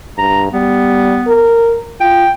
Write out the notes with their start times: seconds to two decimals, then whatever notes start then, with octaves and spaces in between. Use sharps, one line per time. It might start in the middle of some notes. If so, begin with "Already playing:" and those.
0.18 G2 A#5
0.51 G3 B3
1.28 A#4
2.00 F4 G5